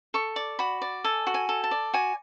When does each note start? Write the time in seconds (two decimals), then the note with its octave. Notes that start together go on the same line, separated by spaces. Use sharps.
0.14 A4 C#6
0.36 D5
0.59 F#4 B5
0.82 D5
1.04 A4 G#5
1.27 F#4
1.34 G#5
1.49 A4
1.64 A5
1.71 D5
1.94 F#4 G#5